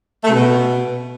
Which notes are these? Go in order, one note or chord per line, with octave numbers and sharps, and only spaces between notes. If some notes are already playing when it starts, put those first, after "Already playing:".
A3
C3
B2